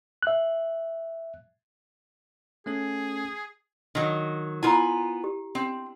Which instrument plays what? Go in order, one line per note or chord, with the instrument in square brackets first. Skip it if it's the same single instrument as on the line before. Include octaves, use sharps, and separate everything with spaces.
[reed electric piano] E5 F#6
[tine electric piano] A3 C#4 A4 [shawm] G#4
[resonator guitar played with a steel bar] D#3 F#3
[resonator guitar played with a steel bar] B3 F4 G#5 [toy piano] E4 A#4 A#5
[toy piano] G4
[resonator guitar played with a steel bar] C4